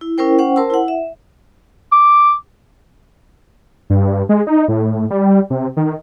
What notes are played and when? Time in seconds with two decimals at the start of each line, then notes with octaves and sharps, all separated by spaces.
0.01 E4
0.18 C#4 E4 A#4 C5 G5
0.38 C#4 C5 F#5 G5
0.56 A#4 C5 A5 C6 E6
0.70 E4 F#5
0.88 E5
1.92 D6
3.90 G2
4.29 G#3
4.47 D#4
4.68 A2
5.10 G3
5.50 C3
5.77 D#3